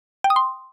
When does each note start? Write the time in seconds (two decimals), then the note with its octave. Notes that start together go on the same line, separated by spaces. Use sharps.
0.24 G5
0.30 D#6
0.36 C6